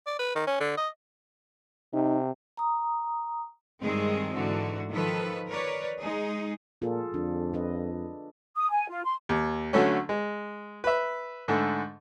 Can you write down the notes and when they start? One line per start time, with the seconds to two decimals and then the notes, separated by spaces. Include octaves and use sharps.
0.07 D5
0.19 B4
0.35 D#3
0.47 C#4
0.60 D3
0.77 D#5
1.93 C3 D#4
2.57 A#5 D#6
3.82 G2 D#3 G3 G#3 C4 G#4
4.33 G#2 D3 E3 F#4
4.92 D#3 F3 A4 B4
5.47 A#4 B4 C#5 D5
5.99 G#3 D#4 G#4
6.82 A#2 F4 G#4 A4
7.14 F2 D4
7.53 D4 B4 D#5
8.56 D#6
8.71 G#5
8.89 F4
9.05 C6
9.29 D#2
9.73 D3 F#3 A3 C#4
10.09 G#3
10.84 B4 E5
11.48 G#2 D3 A3